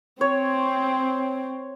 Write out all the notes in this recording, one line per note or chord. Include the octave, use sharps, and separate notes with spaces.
C4 C#5